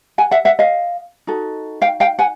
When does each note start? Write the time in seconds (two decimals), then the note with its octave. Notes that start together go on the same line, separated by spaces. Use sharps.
0.18 F#5 G#5
0.31 E5 F#5
0.45 E5 F#5
0.59 D#5 F5
1.27 D#4 F#4 A4
1.82 F5 G5
2.00 F5 G5
2.19 F#5 G#5